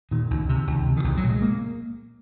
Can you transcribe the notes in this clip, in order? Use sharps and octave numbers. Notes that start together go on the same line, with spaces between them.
A#2 D#3
C#2
C3
C#2
C3
D#3
C2 F3
F#3
A#2
G#3
A#3